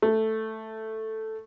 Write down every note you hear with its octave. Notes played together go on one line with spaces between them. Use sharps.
A3